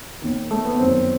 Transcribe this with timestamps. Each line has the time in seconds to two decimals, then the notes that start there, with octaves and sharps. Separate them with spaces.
0.22 D#2 D#3
0.51 A3
0.65 B3
0.79 G1 F#2 D#3 C4